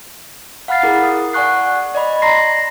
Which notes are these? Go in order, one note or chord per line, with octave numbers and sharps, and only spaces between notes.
F5 F#5 B5 F6 A6 C7
E4 G#4 A#4
D#6
D5 F#5 G#5 C#6 F#6 C7
D5 D#5 B5
A#5 C6 A#6 C7